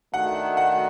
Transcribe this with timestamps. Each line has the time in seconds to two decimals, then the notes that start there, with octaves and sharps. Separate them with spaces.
0.13 D#3 A3 D4 F#4 F#5
0.57 F#5